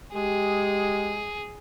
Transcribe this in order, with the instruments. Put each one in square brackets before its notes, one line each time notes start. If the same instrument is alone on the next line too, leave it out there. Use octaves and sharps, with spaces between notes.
[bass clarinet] G#3 [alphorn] G4 [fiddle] G#4